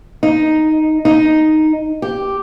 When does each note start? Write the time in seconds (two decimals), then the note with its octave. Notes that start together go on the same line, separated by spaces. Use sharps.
0.23 D#4
1.05 D#4
2.02 G4